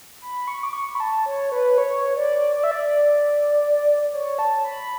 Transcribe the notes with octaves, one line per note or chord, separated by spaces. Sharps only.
B5
C#6
D6
C#6
B5
A5
C#5
B4
C#5
D5
D5
E5
D5
C#5
A5
B5